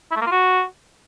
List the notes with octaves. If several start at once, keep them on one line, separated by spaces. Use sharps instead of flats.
E4
A3
A#3
F4
F#4